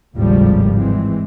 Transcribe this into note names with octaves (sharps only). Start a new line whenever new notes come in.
G#1 D#2 A2 C#3 F3 G3
E3 G#3 C4